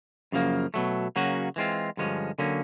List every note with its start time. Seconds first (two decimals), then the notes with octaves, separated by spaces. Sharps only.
0.32 F#2 C#3 F3 A#3
0.74 B2 F#3 A3
1.16 C#3 F#3 A#3 C#4 F#4
1.56 E3 G#3 C4 F4
1.97 G2 D3 F3 G#3 C#4
2.39 D3 F#3 A#3 C#4